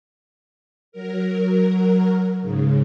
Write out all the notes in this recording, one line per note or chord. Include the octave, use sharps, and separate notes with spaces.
F#3 A#4
G#2 C#3